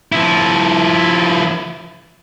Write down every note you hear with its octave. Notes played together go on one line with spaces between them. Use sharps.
F3 E4